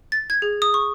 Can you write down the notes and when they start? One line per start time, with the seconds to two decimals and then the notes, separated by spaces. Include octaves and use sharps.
0.12 A6
0.30 G#6
0.42 G#4
0.62 D#6
0.74 C#6